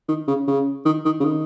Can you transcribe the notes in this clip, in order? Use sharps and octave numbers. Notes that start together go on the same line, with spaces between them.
D#3
C#3
C#3
D#3
D#3
C#3
D#3